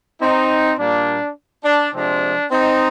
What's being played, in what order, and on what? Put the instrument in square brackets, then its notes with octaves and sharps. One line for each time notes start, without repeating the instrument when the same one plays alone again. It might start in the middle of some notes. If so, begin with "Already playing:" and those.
[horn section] C4 D#4
A#2 G3 A#3 D4
D4
C3 F3 G#3 C4 D4
C4 D#4